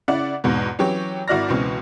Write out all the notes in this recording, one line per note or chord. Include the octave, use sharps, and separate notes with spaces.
C#3 E4 D5 F#5
E2 G#2 B2
E3 F#3 C#4 G4 C#5
G#1 E4 F#4 D5 F6 A#6
C#2 B2 E3 C4